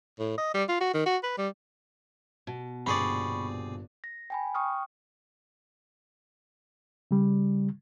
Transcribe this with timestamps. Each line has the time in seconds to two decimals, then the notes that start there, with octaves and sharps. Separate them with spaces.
0.19 A2
0.38 D#5
0.54 G3
0.69 F4
0.81 F#4
0.94 D#3
1.06 F#4
1.23 B4
1.38 G3
2.47 B2
2.86 G1 G2 A#2 C4 G#4 D5 B5 C#6
4.04 A#6
4.30 G5 G#5 B5
4.54 G5 C#6 D#6 F6
7.11 C#3 G3